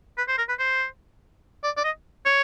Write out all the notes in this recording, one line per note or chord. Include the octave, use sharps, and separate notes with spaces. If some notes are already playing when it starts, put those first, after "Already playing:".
B4
C5
A#4
B4
C5
D5
D5
D#5
C#5